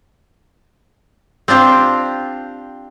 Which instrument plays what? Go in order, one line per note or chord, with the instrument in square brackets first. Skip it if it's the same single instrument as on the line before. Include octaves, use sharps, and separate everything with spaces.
[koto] C4 D4 F4 G4